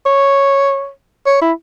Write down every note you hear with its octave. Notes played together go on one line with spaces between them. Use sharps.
C#5
C#5
E4